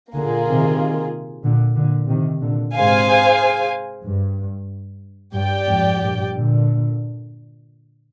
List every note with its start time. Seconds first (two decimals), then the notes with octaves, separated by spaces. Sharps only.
0.13 A#2 D3 A#3 F4 G#4
0.46 C3 D#3
1.44 A#2 D3
1.76 A#2 D3
2.08 C3 D#3
2.41 A#2 D3
2.74 G#2 C3 G#4 C5 F5 G#5
4.05 G2
5.34 G2 G4 D5 G5
5.67 F2 G#2
6.00 G2 A#2
6.32 A#2 D3